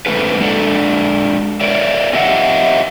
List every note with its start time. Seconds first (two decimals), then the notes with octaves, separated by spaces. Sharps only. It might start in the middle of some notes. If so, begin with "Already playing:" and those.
0.06 D3 G#3 A3 C4 A4 B4
0.41 G#3 D4 A4 D5
1.61 A#4 C#5 D5 E5
2.13 C4 G4 D#5 E5 F#5